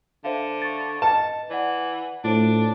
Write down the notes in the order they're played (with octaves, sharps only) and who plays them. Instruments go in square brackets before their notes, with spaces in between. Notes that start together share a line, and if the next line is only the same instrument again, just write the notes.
[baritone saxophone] D3 [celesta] C5 E5 F5
[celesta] C#6 A6
[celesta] B4 D#5 C#7 [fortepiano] A5
[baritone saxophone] E3 [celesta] D5 F#5
[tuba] A2 [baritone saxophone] D4 [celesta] F4 C5 D7